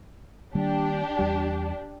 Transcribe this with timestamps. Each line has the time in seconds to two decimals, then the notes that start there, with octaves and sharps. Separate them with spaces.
0.55 D#3 G3 A#3 D4 G4
1.19 E2 G3